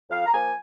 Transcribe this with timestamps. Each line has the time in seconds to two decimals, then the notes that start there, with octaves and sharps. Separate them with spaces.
0.09 F2 F5
0.25 A#5
0.32 F3 A#3 G#5